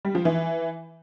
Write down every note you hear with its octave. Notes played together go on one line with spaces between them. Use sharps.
G3
F3
E3